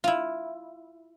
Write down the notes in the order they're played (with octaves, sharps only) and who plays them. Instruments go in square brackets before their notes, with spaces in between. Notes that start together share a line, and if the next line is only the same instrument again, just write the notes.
[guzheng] E4 F4